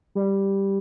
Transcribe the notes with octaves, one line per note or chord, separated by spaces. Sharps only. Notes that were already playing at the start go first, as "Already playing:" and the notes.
G3